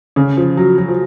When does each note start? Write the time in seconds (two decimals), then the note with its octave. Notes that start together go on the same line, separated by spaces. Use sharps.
0.16 C#3
0.37 F3
0.57 F#3
0.78 F#3
0.88 F3